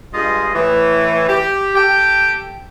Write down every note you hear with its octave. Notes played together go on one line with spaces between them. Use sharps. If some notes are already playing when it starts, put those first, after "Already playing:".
G2 G#3 F4 G#4 D#5
A2 E3
G4
G4 A4 G5